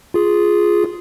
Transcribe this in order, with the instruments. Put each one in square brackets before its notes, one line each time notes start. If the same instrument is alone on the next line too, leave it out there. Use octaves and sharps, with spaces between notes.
[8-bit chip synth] F4 G#4